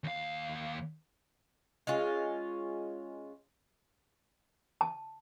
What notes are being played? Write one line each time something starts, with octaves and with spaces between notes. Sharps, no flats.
D#2 F5
G#3 C#4 F4
A5